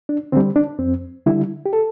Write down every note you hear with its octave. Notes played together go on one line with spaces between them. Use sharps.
D4
D3 G3 C4
D4
F2 C4
D3 G3 E4
G4
A4